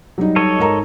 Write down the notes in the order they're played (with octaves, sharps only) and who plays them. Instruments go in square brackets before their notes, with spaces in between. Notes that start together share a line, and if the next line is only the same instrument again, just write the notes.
[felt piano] F#3 G3 D#4
[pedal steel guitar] A4 C#5 D#5
[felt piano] G#2 A#4 A#5